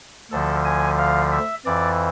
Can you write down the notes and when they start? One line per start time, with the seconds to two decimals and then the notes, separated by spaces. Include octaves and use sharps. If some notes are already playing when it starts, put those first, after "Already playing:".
0.31 D2 D3 F3 A4
0.65 G#5
0.98 F5
1.32 E5
1.65 F2 E3 D5